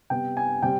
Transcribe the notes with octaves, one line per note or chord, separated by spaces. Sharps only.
C3 G3 B3 G5
G#5
C3 G3 C4 G5